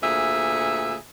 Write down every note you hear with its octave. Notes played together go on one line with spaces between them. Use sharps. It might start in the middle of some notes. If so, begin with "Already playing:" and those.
D2 A#2 G#4 E5